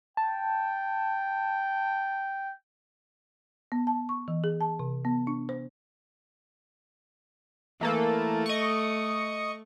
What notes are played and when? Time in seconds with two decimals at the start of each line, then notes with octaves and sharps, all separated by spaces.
0.17 G5 A5
3.72 B3
3.87 A5
4.09 C#6
4.28 E3
4.44 G#4
4.61 A5
4.79 C3
5.05 B3
5.27 D4
5.49 C5
7.81 E3 A3 A#3 A4
8.46 D#5 C#6